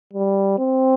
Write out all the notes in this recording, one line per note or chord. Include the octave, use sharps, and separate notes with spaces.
G3
C4